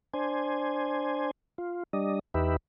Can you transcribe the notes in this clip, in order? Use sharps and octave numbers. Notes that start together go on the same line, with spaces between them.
D4 C5 G#5
F4
G3 D4 D#5
E2 D#4 G4 B4 E5